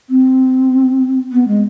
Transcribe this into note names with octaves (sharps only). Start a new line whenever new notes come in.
C4
B3
G#3